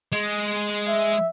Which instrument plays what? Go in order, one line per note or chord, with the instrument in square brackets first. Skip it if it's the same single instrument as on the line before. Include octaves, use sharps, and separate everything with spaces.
[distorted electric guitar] G#3
[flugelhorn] E5